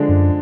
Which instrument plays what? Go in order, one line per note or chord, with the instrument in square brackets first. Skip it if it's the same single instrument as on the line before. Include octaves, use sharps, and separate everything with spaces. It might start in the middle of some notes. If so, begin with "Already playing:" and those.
Already playing: [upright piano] D3 F3 G#3 D4
[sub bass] F#2